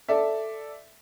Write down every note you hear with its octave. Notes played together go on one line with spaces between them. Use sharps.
A4 D5 E5